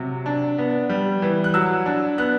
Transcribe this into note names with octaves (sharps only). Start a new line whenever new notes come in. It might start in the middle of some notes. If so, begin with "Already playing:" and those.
Already playing: C3 F#3
D4
B3
G3
E3
F#6
F#3 E6
D4
B3 F#6